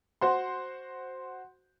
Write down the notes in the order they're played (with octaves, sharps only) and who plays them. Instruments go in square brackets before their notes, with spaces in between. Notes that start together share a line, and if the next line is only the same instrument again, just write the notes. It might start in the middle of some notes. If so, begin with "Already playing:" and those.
[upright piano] F#4 C5 F#5 C6